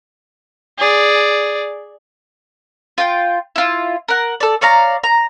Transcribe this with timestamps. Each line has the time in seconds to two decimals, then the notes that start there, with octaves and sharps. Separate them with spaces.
0.79 G#4 D5
2.98 F4 G5
3.56 E4 F4
4.08 A#4 F#5
4.40 A4 D5
4.61 C#5 D5 F5 A#5
5.04 A#5